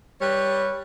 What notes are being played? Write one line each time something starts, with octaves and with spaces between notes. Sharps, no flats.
G3 B4 C#5